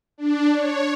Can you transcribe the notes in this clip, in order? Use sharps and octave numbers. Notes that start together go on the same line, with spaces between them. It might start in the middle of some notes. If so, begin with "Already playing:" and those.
D4
C#5